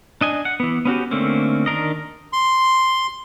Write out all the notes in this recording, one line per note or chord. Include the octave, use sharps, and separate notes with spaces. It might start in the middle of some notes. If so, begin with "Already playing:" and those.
D4 D#5 G#5
F#5
E3 B3
B3 C#4 F#4 G4
D3 A3 A#3 C4 C#4
D#3 D4 A#4 D#5
C6